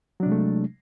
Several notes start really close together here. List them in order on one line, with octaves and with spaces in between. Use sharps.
F#3 D4 C3 G#3 A3